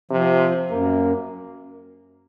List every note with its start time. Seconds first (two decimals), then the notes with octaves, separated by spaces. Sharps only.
0.11 C3 F3
0.71 F#2 A#3